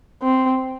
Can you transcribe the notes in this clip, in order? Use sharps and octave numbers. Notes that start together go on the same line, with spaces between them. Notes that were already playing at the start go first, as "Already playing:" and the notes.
C4